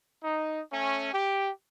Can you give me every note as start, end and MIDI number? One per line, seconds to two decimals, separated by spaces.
0.24 0.61 63
0.72 1.12 57
0.72 1.12 61
1.14 1.50 67